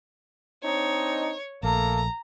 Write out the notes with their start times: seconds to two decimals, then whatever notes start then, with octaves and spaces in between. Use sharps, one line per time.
0.64 C4 D4 D#4 C#5
1.63 A#1 A3 A#3 A4 A#5